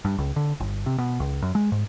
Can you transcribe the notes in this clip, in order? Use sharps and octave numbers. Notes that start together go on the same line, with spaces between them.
G2
C#2
D3
G1
C3
B2
C#2
F#2
G#3
G#2